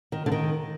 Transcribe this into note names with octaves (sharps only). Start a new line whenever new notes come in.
D#3
D3
D#3